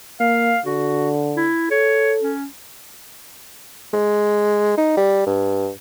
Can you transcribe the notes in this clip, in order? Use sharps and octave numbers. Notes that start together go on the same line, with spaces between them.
A#3 F5
D3 F#4
E4
A4 C#5
C#4
G#3
D#4
G3
G2